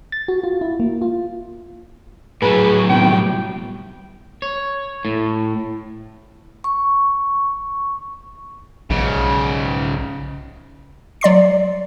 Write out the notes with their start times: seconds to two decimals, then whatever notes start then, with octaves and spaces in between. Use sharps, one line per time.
0.12 A6
0.28 F#4
0.43 F4
0.61 E4
0.80 A#3
1.02 F4
2.42 A2 F#3 G#4 B4
2.90 C3 D#3 B3 G5
3.09 G3
4.42 C#5
5.05 A2
6.64 C#6
8.90 B1 G#2 C#3
11.21 F#3 D5 C6 C7